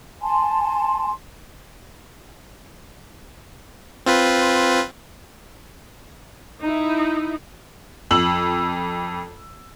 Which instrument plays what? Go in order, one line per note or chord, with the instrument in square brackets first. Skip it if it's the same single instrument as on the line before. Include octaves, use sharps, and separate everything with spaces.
[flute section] G#5 A5 C6
[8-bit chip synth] C4 F4 B4
[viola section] D#4 E4
[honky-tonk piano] F2 E6 F#7